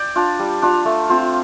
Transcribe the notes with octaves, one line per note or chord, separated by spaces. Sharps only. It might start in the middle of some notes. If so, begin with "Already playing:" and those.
Already playing: D5 G5
D4 F4
G3
D4 F4
A3
C4 F4